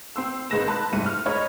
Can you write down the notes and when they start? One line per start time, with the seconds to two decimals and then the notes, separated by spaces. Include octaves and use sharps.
0.16 C4 C6 E6
0.50 G#1 G#3 B4 A#6 E7
0.68 A5 B5 F#6
0.93 F1 G#2 G3 E4 C#7 D#7
1.06 F6
1.26 C#5 D#5 A#5 B5 F6